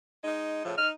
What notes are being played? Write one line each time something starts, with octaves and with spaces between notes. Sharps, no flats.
G#3 D#4
A2 C#3 F3
D#4 F6